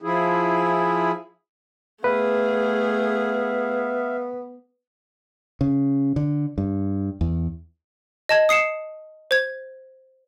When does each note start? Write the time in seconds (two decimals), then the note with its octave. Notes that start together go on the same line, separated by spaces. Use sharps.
0.02 F3 E4 G#4
2.04 A3 B3 G#4 B4 E5 F5
5.61 C#3
6.16 D3
6.58 G2
7.21 E2
8.29 D#5 A5 G#6
8.49 D#6 C7 C#7 E7
9.31 C5 G#6